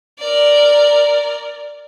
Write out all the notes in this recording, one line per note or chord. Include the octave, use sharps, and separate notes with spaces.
A#4 D5